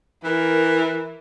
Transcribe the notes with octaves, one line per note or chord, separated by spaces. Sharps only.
E3 A#4